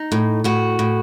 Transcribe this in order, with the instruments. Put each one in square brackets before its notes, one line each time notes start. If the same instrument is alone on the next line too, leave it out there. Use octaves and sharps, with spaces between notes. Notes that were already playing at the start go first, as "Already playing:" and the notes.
Already playing: [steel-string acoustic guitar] D#4
A2
A2 F#4
A2